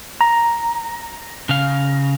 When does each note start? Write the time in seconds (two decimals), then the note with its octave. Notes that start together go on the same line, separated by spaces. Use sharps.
0.21 A#5
1.49 C#3 F5